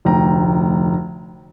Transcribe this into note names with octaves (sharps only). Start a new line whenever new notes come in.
F1 D2 G5 A#5